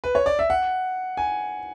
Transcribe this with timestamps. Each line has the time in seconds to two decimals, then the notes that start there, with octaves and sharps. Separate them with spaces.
0.04 B4
0.15 C#5
0.26 D5
0.39 E5
0.50 F#5
1.17 G#5